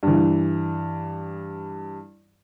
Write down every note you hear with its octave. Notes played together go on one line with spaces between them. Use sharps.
G2 E3